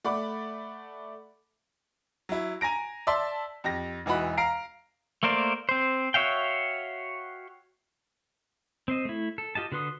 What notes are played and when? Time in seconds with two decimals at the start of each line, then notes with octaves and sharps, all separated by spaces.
0.04 A3 D5 F#5 B5 D6
2.29 F#3 E4
2.61 G#5 A#5 A#6 D7
3.07 D5 E5 A5 C6 E6
3.64 F2 G4 A#6
4.06 E1 E3 D#4 F#4 B5
4.37 F5 A#5 C7 D7
5.23 A3 A#3 A#4 C5 D5
5.69 C4 C5
6.14 F#4 C#5 E5 F5 G5
8.88 C4 C5 D#5
9.05 A3 E4
9.38 A4
9.55 F4 G4 D#5 A5
9.72 D3 F#4 B4 C6 D#6